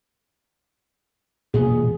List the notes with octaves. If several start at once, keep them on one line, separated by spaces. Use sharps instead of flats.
E1 A#2 B3 G#4